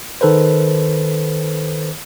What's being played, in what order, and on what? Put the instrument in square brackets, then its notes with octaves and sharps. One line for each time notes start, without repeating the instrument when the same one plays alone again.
[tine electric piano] D#3 A4 B4 C5